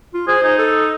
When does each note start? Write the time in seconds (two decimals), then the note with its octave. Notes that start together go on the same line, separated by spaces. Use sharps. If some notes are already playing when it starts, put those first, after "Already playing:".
0.14 F4
0.28 G#4 C5
0.43 D#4
0.59 A4